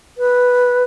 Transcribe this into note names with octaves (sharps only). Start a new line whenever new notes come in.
B4